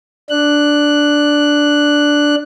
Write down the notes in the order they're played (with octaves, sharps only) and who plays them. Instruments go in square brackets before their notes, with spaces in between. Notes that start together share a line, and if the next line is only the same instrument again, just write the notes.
[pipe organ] D4 F#6